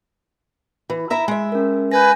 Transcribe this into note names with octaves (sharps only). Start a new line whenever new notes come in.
E3
E4 E5 A#5
G#3 E5
C#4 A#4
B4 G#5 G6 G#6 A#6